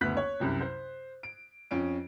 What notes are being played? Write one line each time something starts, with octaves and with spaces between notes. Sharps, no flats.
F#1 D2 B3 F#6 B6
C#5
C2 F#2 C3
C5
D7
F2 C#4 D7